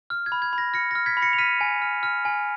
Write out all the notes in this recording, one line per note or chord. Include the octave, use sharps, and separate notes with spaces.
F6
G#6
B5
G#6
B5
A#6
F6 A#6 C#7
A#6
F6
G#6 B6
B5
A#6 C#7
F7
F6 B6 D#7
G#5
F6
F6
G#5